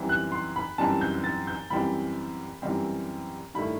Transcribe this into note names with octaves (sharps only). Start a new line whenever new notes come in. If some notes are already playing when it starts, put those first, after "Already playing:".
Already playing: F#2 E3 G3 C4
F#6
C6
B5
F#2 E3 G3 C4 A5
G6
G6
A6
G6
F#2 E3 G3 C4 B5
F#2 E3 G3 C4
G2 D#3 A3 E4 B5